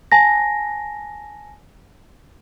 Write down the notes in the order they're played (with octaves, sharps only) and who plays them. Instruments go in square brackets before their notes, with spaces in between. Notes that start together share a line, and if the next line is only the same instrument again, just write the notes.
[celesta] G#5 A5 A#6